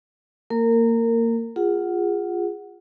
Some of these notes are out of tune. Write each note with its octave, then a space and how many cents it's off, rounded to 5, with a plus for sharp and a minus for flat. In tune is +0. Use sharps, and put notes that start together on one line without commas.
A#3 -20 A#4 -25
F4 +0 G#4 -25 F#5 +0